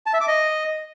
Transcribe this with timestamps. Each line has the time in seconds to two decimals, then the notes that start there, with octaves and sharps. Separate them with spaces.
0.06 A5
0.14 E5
0.21 D6
0.28 D#5